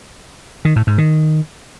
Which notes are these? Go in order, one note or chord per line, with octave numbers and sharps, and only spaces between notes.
D#3
A2
G#2
D#3